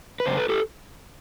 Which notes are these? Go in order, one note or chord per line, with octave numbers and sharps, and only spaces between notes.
B4
F#2 C#3 C5
A4 B4
G4 A4